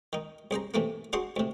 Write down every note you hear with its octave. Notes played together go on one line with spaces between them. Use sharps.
D#3 D#4
C2 G#4 C5 A#5
C3 E3 A3 A#3
D4 F#4 G#4 C5 F#5 C6
D2 C3